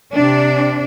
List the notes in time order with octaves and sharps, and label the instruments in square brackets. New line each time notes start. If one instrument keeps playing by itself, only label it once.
[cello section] C3 D4